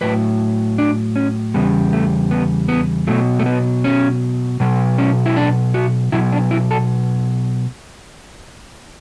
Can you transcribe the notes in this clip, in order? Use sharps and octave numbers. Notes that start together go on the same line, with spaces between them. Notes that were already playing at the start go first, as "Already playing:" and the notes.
A2 F#3 B4
D4
C#4
E2 C#3 G3 B3
A3
B3
B3
B2 F#3 A3
A3
B3
C#4
B2 F#3
C#4
E4
D4
F#4
B2 F#3 E4
D4
E4
A4